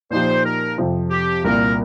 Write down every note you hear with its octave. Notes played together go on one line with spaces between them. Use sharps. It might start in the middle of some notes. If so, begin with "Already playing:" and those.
A#2 F3 D#4 G4 C5
A#4
F2 C3 F3
G4
C2 A#2 G3 A#3 A#4